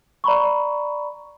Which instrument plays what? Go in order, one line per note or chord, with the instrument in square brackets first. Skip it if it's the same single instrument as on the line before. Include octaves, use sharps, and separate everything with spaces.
[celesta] D5 A#5 B5 C#6